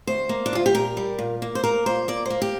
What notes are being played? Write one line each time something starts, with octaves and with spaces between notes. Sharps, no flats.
D2 C5
A#3
D4
D2 F4
G4
A#2 A#4
G3
A#2
A#3
C5
A#3 A#4
A#2 C5
A#3 D5
A#3 C5
G4